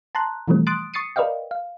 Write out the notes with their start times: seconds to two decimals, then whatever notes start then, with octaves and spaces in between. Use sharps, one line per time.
0.15 A5 A#5 C6 F#6
0.48 B2 E3 F3 G3 A3 C4
0.67 C6 D#6 F#6 A6 D7
0.94 C#6 D#6 A6 C7 C#7 D#7
1.16 A#4 B4 D5 D#5 F5 G5
1.51 F5